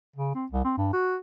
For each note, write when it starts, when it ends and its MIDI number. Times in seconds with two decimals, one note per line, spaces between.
0.16 0.34 49
0.35 0.46 60
0.52 0.63 36
0.64 0.74 60
0.78 0.93 43
0.93 1.17 66